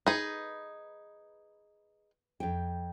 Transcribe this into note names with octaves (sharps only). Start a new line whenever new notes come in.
D#4 G#4 B4
F2 G5